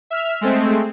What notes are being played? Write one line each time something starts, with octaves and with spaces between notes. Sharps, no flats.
E5 F6
G#3 A3 C4